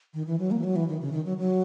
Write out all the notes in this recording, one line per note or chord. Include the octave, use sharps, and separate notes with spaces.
D#3
E3
F#3
A#3
E3
F#3
E3
D#3
C#3
D#3
F#3
F#3